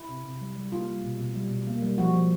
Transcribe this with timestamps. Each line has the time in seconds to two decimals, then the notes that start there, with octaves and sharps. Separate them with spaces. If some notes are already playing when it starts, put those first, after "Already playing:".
Already playing: E4
0.09 C3
0.25 C3
0.41 G3
0.56 G3
0.72 A#3 F4
0.88 G3
1.04 B2
1.19 B2
1.35 G3
1.51 B2
1.67 A#3
1.82 G3
1.98 F3 F#4
2.14 F3